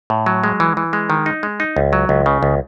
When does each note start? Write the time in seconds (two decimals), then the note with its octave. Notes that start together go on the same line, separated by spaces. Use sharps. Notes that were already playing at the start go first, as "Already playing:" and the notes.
0.10 A2
0.26 F#3
0.44 G#3
0.60 E3
0.77 E3
0.93 G#3
1.10 D#3
1.26 D#4
1.43 G#3
1.60 D#4
1.77 C#2
1.93 F#3
2.09 C#2
2.26 C#3
2.43 C#2